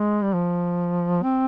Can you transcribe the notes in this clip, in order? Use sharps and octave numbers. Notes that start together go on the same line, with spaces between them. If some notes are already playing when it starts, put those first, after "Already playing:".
Already playing: G#3
G3
F3
C4